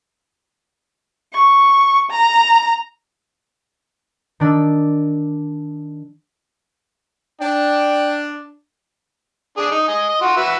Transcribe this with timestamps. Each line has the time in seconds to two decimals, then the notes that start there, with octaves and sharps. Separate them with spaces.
1.34 C#6
2.10 A#5
4.40 D#3 D4 E6
7.41 D4 G5
9.57 D4 G#4
9.71 D#4 D#6
9.88 D#5 G#5
10.09 D#5
10.21 F4 F#4
10.37 F#4 B4 E5